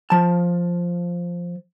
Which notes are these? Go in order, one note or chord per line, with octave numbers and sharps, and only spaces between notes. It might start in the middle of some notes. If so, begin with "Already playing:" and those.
F3 A5